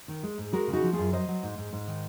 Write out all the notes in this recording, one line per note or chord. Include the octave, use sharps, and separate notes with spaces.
D#3
G#3
G#2
G#3 F#4 A#4
C#3
D#4 F#4
F3
F#2 F4 G#4
F#3 C5 D#5
F#3
G#2
G#2
G#2
D#3